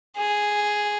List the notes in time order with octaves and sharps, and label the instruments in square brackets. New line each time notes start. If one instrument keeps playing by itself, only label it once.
[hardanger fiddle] G#4